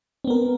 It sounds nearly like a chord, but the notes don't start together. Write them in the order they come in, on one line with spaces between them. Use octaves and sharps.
C4 B3 A#4